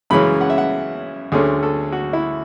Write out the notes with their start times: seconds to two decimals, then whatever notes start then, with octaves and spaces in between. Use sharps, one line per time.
0.10 F#2 C#3 E3 G#3 C#4 B5
0.41 F#5
0.50 E5
0.58 F#5
1.32 D2 D3 A3 C#4 G#4
1.63 A4
1.92 F#4
2.13 E4